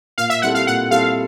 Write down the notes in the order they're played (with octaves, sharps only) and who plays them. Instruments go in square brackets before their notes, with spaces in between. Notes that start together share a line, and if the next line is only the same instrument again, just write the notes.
[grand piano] A#2 [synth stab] F5
[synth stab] E5
[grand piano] G3 C4 E4 A4 [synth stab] F#5
[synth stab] F5
[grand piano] A#2 [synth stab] F#5
[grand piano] G3 C4 E4 A4 [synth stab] F5